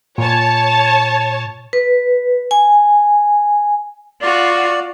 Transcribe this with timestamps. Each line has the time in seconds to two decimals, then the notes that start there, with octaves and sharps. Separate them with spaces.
0.18 A#2 C#5 A5
1.73 B4
2.51 G#5
4.22 F4 F#4 D5